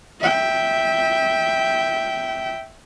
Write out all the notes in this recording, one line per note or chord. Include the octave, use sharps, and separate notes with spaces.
E5 G5